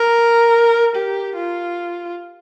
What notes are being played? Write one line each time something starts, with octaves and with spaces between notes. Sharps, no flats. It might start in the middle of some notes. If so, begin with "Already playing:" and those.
Already playing: A#4
G4
F4